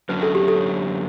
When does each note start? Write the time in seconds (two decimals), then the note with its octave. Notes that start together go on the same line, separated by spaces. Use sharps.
0.09 F#2 D3 F#3 B4
0.23 A4
0.35 G4
0.48 A4